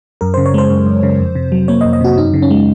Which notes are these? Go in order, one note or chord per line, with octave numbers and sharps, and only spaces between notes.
F#2 A#4
C#3 C5
C#5
G#3 C5
F#2
F#2
C#3
F2
C3
F#3
A#3 C#5
D#5
F2
D#5
C3 F#4
F#2 D#4
C#3
C#4
G#3